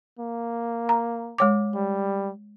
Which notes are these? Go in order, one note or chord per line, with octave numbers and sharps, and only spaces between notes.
A#3
A#5
G#3 C#5 D6
G3